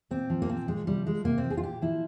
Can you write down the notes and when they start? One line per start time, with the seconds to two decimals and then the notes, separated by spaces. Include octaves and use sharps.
0.11 A#2 C4
0.30 F3
0.42 A#3
0.49 A#2 C4
0.68 F3 G#3
0.87 C3 G3
1.06 F3 G#3
1.25 C3 A#3
1.38 C4
1.44 F3
1.50 G#4
1.57 F4
1.63 A#2 G4
1.82 F3 E4